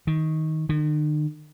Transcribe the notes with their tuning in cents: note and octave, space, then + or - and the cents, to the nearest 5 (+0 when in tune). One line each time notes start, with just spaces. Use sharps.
D#3 +15
D#3 -45